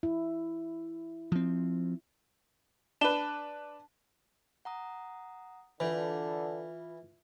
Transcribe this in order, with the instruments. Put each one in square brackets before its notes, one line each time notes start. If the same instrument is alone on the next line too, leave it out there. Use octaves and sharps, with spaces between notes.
[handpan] E4
[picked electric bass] F3 C4
[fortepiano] D4 B4 [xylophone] A5 E7 G7
[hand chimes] F#5 A#5 D#6
[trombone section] D3 [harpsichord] E3 [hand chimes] F4 B4